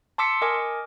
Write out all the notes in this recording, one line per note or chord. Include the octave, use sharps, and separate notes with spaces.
A5 C6 D6 E6 B6 C#7
A#4 D#5 G#5 D6